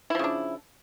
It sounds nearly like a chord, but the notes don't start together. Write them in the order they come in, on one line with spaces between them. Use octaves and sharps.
E4 F3 C#3 D4